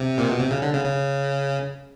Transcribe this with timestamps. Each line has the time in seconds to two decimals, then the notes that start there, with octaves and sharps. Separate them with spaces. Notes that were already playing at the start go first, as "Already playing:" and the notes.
Already playing: C3
0.18 A#2
0.30 B2
0.40 C3
0.51 C#3
0.62 D3
0.74 C#3
0.85 C#3